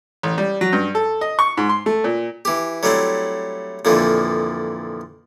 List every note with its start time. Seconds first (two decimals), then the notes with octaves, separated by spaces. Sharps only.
0.23 A1
0.38 G3
0.61 F#3
0.73 G2
0.95 A4
1.21 D#5
1.39 C#6
1.57 G#2
1.69 C6
1.86 A3
2.04 A#2
2.45 E3 G4
2.83 F#3 G3 A3 C4 E4
3.85 F2 A#2 D3 E3 F3